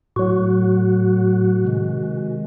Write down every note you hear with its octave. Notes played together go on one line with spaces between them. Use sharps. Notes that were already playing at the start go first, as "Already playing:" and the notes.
A2 F#3 F#4
C3 D#3 G#3